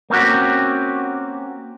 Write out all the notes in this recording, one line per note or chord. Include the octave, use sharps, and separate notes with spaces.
A#3 C4 C#4 F#4 G4